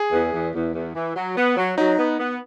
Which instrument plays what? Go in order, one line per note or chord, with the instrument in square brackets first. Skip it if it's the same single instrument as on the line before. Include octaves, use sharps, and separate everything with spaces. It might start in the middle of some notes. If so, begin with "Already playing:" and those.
Already playing: [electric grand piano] G#4
[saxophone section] E2
E2
E2
E2
E3
F#3
B3
F#3
[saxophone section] F#3 [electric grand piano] D#4
[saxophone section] B3
B3